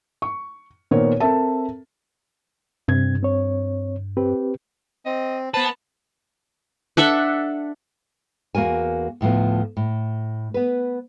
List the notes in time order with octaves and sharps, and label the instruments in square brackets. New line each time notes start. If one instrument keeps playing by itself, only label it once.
[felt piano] C#6
A#2 D#3 B3 A#4 C5 C#5
C4 A4 A#4 E5 A5
[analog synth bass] G2 [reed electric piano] C3 C4 G#6
[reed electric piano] C4 C#5
C4 G4 B4
[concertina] C4 [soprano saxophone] D#5
[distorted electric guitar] B3 B4 [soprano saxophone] C5 [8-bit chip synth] A5
[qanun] D4 A4 E5 F#5
[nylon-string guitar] E2 A#3 F#4 A#4 G#5
D2 A2 F3 B3
A2
B3 B4